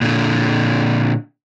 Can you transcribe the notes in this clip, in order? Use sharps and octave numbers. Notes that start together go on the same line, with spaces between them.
A#2 D3